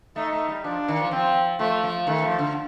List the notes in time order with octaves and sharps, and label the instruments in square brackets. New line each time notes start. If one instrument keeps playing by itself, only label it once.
[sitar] A3 [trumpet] D#4
[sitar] A3
G3
[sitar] F3 [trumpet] D4
[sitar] D#3
F3
[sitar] F3 [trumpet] C4
[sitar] F3 [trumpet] A3
[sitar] F3
[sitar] D#3 [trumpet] A3
[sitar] F3
D3